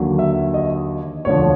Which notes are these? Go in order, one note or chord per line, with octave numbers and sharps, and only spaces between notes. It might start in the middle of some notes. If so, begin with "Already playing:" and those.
Already playing: D#2 D3 F#3
E5
D#5
E1 D2 D3 F3 C#5